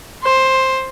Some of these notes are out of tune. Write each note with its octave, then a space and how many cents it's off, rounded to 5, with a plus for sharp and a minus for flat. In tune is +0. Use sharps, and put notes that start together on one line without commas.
C5 +10